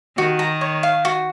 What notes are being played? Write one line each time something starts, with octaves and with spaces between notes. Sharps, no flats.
D#3 F#4
A#5
C#5
F5
F#4